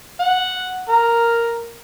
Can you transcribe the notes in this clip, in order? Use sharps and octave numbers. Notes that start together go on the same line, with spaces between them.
F#5
A#4